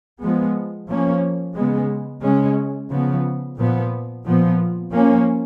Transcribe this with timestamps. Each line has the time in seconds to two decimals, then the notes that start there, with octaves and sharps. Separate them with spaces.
0.21 F3 G#3 B3
0.88 F3 A#3 C#4
1.56 C#3 G#3 B3
2.23 C#3 G#3 C#4
2.90 C#3 F3 B3
3.58 A#2 F3 B3
4.25 A#2 F3 B3
4.92 F3 A#3 C#4